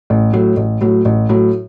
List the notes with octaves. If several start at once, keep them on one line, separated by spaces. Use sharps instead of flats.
A1
A2 F#3
A1
A2 F#3
A1
A2 F#3